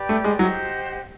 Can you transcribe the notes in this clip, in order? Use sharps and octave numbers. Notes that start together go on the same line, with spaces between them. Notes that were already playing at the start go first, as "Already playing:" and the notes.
Already playing: G4 B4 D5 G5
A3
G#3
F#3 G4 C5 D#5 F#5